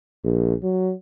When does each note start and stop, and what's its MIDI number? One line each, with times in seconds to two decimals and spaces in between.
0.25 0.54 34
0.63 0.92 54